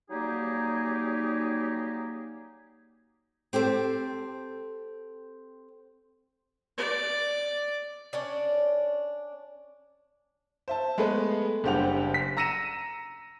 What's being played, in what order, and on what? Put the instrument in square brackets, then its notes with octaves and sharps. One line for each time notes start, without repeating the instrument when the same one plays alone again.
[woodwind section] F#3 G3 A#3 D#4 G4 G#4
[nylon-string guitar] C4 G4 A4 C5
[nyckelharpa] D5
[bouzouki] C#4 D4 D5
[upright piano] C5 E5 A5
G#3 A3 B3 G#4 A4 B4
F#1 G2 G4 C5 F#5 F7
B6
A#5 E6 A#6 C#7 D#7 E7